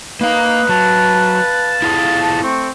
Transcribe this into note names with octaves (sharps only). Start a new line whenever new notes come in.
A#3 D#4 B4 F5
F#3 F5 A5
E4 F4 G#4
A3 C4 C#6